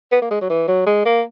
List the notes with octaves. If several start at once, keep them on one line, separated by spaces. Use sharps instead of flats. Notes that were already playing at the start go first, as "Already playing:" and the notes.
B3
A#3
G#3
F#3
E3
F#3
G#3
A#3